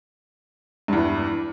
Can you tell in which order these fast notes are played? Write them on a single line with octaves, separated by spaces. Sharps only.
G2 E2 E3